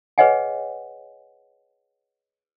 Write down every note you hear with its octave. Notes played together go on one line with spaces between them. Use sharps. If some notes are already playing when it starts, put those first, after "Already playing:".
G#4 B4 C#5 D#5 F#5 G#5